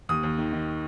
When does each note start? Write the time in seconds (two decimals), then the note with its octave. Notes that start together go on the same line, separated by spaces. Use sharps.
0.09 D#2 D#6
0.23 D#2
0.38 D#3
0.53 D#3